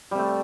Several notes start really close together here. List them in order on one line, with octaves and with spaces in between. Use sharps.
G3 C3 A3